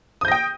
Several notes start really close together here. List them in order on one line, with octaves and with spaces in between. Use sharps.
D#6 G6 A#6 G5